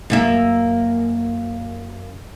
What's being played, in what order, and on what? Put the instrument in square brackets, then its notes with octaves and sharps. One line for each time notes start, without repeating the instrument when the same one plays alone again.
[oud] F#2 A#3 E5